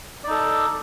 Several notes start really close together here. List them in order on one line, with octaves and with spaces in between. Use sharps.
D5 D#4 A4